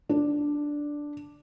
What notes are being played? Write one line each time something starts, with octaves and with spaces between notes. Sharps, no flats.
D4